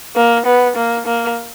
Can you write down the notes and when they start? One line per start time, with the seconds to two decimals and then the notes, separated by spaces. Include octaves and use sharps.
0.16 A#3
0.46 B3
0.76 A#3
1.06 A#3